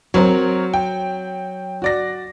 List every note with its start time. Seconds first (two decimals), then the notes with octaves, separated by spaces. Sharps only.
0.14 F#3 C4 A#4 C#5
0.74 G5
1.82 F#4 D5 A#6